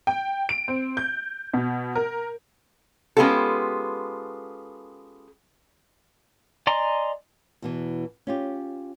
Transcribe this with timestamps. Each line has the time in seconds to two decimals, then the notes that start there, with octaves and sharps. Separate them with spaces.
0.07 G5
0.49 D7
0.68 C4
0.97 G6
1.54 B2
1.95 A#4
3.17 G#3 B3 C#4 F4 G4 A4
6.67 D5 D#5 G#5 A#5 C6
7.62 E2 B2 E3
8.27 C#4 F4 G4